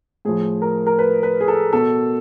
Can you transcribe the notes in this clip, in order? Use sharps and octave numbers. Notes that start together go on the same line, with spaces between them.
A2 F3 G#4
A#4
A#4
B4
B4
G#4
A4
B2 A4